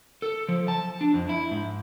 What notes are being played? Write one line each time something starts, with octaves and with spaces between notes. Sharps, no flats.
A4
F3
A5
D4
F2
E4
G#2